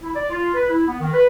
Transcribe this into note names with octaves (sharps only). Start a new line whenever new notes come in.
E4
D5
F4
B4
E4
B3
D#3
B4